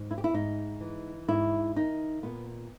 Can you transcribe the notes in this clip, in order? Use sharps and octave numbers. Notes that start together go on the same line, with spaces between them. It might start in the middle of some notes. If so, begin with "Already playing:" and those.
Already playing: G#2
E4
G4
E4
G#2 D#4
E3
G#2 E4
D#3 D#4
A#2 B3